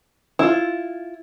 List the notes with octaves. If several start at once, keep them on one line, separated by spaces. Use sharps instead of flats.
E4 F4